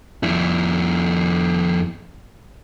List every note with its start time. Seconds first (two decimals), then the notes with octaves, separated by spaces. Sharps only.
0.23 F2 E4